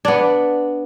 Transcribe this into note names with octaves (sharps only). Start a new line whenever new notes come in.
B3 D4